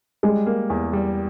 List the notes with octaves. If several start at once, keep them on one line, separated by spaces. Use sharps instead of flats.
G3 G#3
A#3
E2
G3